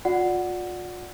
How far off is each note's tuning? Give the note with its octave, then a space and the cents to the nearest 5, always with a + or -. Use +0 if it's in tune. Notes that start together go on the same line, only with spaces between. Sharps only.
F4 +35 D5 +0 F#5 +0